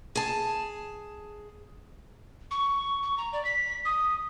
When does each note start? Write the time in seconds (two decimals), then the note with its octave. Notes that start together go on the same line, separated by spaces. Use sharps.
0.15 G#4 A5
2.51 C#6
3.03 C#6
3.18 A#5
3.33 D5
3.45 B6
3.85 D#6